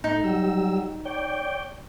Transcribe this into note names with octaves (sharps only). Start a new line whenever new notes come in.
A2 D#4
F#3 G3 E6
C#5 D5 G5